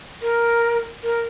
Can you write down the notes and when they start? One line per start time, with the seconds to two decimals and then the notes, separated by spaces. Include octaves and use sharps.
0.21 A#4
1.03 A#4